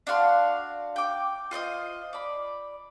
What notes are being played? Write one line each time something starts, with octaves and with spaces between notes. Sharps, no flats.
D4 F#4 F5 C6
G5 D6
F4 C5 D5 D#5
D5 B5